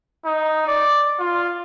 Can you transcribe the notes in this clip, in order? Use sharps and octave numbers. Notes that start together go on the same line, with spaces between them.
D#4
D5
F4